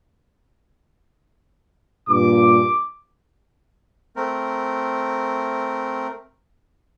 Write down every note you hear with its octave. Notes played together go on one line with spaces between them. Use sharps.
G2 A#2 D6
A3 C4 A#4